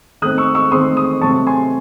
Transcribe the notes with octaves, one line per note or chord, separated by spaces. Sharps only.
D#3 A3 C4 D#6 F#6
C#6 E6
C#6 E6
D#3 A3 C4 C6 D#6
C6 D#6
C3 F#3 A3 C4 A5 C#6
G#5 C6